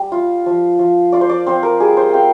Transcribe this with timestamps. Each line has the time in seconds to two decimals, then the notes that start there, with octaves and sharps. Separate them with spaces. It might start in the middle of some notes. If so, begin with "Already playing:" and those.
Already playing: G3
0.12 F4
0.46 F3
0.79 F3
1.12 F4 D5
1.21 C5
1.29 D5
1.46 C4 C5
1.63 A#4
1.80 G3 G#4
1.97 C5
2.09 C4 F5 G5